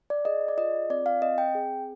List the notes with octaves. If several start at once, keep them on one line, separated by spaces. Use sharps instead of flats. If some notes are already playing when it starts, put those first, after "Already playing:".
D5
G#4 D#5
D5
F4 D#5
C4 D5
F5
C4 D#5
G5
G#4